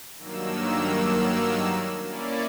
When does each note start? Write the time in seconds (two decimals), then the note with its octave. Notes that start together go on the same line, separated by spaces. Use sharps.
0.18 G2 D#3 F#3 A#3 E6
2.02 A#3 C#4 E4 D5